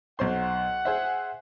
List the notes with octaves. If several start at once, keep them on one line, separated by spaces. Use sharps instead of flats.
B1 C5 F#5 C6
G#4 C5 E5